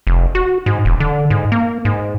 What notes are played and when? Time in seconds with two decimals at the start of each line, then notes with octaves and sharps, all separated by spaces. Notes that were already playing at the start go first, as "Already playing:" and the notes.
0.07 F1
0.35 F#4
0.66 G#2
0.85 E1
1.00 D3
1.30 G#2
1.52 A#3
1.85 G#2